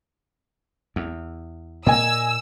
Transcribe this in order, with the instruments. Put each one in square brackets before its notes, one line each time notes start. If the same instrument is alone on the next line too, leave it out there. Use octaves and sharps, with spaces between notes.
[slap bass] E2
[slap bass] A#2 A#3 [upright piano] D#5 G#5 [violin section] E6